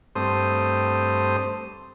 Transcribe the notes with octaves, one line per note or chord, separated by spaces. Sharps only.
G2 A3 C4 C5 D#6